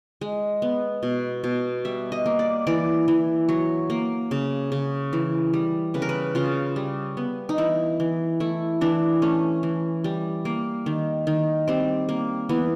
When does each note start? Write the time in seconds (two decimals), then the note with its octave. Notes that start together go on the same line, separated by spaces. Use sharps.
0.21 G#3
0.62 B3
1.03 B2
1.44 B2
1.85 G3 E5
2.12 D#5
2.26 A#3
2.39 D5
2.67 E3 D5
3.08 E3
3.49 F#3 C#5
3.90 A#3
4.31 C#3
4.72 C#3
5.13 E3
5.53 G3
5.94 C#3 B4
6.02 A#4
6.09 B4
6.35 C#3 F4
6.76 G3
7.17 B3
7.49 D#4
7.58 E3 E4
8.00 E3
8.40 A3 E4
8.81 E3 D4
9.22 A3 C#4
9.63 E3
10.04 G3
10.45 A#3
10.86 D#3
11.27 D#3
11.67 G3 C4
12.09 A#3
12.49 E3 B3